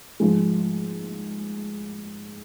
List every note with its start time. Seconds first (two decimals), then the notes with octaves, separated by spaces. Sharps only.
0.20 G#2 F3 G#3